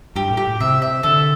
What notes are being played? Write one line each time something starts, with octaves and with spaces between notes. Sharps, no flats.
G2 G4
A2
G4
C3 E5
E5
D3 A4